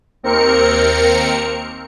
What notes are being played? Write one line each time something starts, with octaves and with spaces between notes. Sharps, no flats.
D#2 C4 A#4 C#7